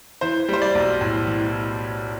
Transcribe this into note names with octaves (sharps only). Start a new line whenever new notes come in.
E3 C5
G3 C5
D5
B1
A2
E3